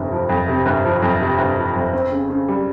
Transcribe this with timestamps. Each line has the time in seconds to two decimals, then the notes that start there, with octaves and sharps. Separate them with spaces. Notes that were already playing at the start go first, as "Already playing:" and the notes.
Already playing: G1 F2 C3
0.11 F3
0.29 F2
0.48 C3
0.66 G1
0.85 F3
1.02 F2
1.21 C3
1.38 G1
1.57 F3
1.76 F2
1.93 C4
2.12 C#3
2.30 C#3
2.48 G3